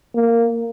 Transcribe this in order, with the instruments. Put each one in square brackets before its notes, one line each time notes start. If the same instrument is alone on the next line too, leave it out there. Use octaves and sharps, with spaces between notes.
[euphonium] A#3